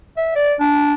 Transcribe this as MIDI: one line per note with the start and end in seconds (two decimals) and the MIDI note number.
0.17 0.33 76
0.35 0.53 74
0.60 0.94 62